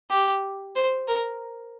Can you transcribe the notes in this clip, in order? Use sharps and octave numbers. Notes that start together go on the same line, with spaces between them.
G4
C5
A#4